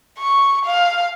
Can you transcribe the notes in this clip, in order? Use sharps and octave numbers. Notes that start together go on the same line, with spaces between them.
C#6
F5